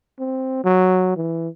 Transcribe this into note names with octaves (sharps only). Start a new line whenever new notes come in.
C4
F#3
E3